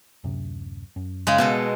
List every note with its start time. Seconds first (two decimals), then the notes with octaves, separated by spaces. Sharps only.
0.24 D1 F#2 C3
0.96 F#2
1.27 C#3 G#3
1.38 B2 G#3 B3 A4